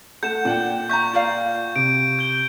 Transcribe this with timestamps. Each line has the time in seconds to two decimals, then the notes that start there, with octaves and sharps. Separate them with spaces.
0.23 A3 F#5 G6 E7
0.45 A#2 D4 F#5 G5
0.89 E5 A#5 C#6 G6
1.13 F4 D5 F5
1.76 C3 D7
2.19 G6 G7